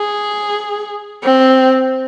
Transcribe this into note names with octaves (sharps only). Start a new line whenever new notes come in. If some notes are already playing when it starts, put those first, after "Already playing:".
Already playing: G#4
C4